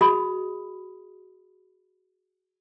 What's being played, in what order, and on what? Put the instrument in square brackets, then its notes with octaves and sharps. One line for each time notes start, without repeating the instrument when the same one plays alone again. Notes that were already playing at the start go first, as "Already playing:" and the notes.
[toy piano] F#4 G#4 D#5 B5 D#6